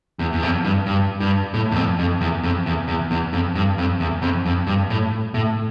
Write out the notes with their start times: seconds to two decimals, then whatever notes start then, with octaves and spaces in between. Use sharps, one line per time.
0.19 E2
0.33 E2
0.42 F2
0.64 G2
0.86 G2
1.20 G2
1.54 A2
1.71 E2
1.76 F2
1.99 F2
2.21 E2
2.43 F2
2.66 E2
2.88 E2
3.11 E2
3.33 F2
3.55 G2
3.78 F2
4.00 E2
4.22 F2
4.46 F2
4.67 G2
4.90 A2
5.34 A2